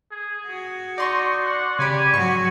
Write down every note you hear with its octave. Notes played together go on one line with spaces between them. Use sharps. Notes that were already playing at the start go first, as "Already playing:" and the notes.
G#4
F#4
D#4 D5 C6 C#6
F#5
C#3 G4 D5 G#5 B5
G#2 F#3 F#4 C#6